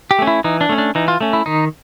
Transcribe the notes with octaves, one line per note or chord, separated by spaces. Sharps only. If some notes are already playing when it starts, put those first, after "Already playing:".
G4
A3 C#4
E4
E3 D#4
D4
A3 C#4
D4
E3 D#4
F4
A3 C#4
E4
D#3 D#4